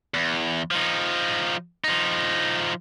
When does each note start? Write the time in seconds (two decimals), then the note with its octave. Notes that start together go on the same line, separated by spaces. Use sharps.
0.14 E2
0.71 F3 D#4
1.84 F3 D#4